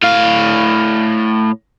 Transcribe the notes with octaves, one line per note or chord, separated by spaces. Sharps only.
A2 F5